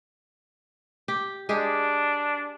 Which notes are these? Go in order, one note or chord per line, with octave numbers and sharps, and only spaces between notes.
G4
G#3 D4 G4 G#4